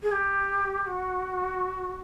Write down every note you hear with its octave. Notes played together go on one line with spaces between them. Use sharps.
G#4
G4
F#4